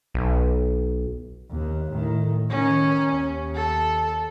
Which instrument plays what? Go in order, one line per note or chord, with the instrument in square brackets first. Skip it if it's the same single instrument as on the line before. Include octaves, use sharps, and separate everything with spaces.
[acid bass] B1
[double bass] D#2
A2 D#3
[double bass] D#3 [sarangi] C#4
[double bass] D#2 [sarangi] C#4
[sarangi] A4